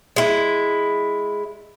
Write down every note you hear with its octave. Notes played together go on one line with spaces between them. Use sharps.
G#3 E4